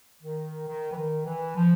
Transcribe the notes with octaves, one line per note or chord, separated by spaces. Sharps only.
D#3
D#3
E3
D#3
E3
F3